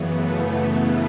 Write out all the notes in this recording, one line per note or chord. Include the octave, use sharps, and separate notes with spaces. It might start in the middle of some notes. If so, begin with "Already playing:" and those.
Already playing: F#2 C#3 E3 B3
A3